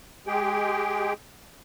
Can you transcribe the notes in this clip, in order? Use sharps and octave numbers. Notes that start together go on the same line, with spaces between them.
G#3 G4 G#4 G5